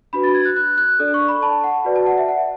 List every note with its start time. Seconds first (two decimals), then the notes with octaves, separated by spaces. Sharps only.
0.13 D4 F#4 B4 B5
0.23 A6
0.34 G#6
0.45 F#6
0.56 F#6
0.78 F#6
0.99 D4 A4 D5
1.14 C#6
1.28 B5
1.42 A5
1.64 F#5
1.85 F#4 B4 D5
1.96 A5
2.07 F#5
2.18 E5
2.28 F#5